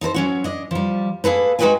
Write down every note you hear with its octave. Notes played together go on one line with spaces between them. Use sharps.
D#4 A4 A#4 C5
F#3 C#4 F#4
D4 D#5
F3 G3
A#3 G#4 A4 B4
G#3 D#4 F#4 B4 G5 G#5